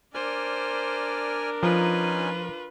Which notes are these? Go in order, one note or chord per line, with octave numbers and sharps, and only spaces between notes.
D4 A#4 C5 D5 G#5 F6
F3 C#4 D#4 F4 B4 G#5